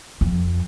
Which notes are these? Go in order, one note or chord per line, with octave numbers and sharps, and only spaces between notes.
F2